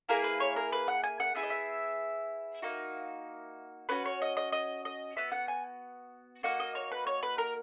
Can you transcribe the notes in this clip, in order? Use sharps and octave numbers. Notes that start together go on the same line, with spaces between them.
A#3 E4 G#4 A#4
B4
C#5
A#4
B4
F#5
G#5
F#5
B3 E4 G#4 E5
D#5
E5
A#3 D#4 F#4
C#4 F#4 B4
C#5
D#5
D#5
D#5
D#5
B3 F#4 E5
F#5
G#5
A#3 D#4 F#4 F#5
D#5
C#5
B4
C#5
B4
A#4